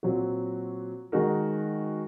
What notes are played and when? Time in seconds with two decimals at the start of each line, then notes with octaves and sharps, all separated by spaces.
0.03 A#2 F#3 C4 F#4
1.12 D#3 G#3 D#4 F#4 A#4